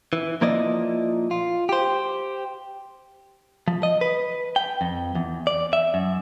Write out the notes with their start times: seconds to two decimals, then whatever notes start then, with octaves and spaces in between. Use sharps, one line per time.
0.13 E3
0.41 A#2 F3 A#3 E4 D5 D#5
1.31 F4
1.69 G4 C5
3.68 F3
3.83 D#5
4.01 B4
4.56 G5
4.81 F2
5.15 E2
5.47 D5
5.73 E5
5.94 F#2